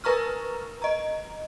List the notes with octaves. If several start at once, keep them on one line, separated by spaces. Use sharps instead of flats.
A#4 B4 A#5 C#6 F6
D#5 A#5